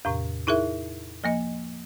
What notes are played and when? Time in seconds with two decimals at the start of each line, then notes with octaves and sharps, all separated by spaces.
0.05 E2 A2 C3
0.47 D#4 E4 G#4 A#4 E5
1.24 F3 A#3 D#5